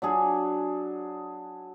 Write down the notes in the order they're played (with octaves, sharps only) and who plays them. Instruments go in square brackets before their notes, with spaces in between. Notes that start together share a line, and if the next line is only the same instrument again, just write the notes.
[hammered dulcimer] F#3 D4 G#4